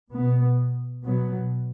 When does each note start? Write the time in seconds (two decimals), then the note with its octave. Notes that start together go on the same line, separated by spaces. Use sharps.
0.15 B2 B3
1.04 B2 F#3 B3